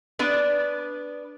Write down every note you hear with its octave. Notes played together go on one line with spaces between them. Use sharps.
B3 D4 B4 D5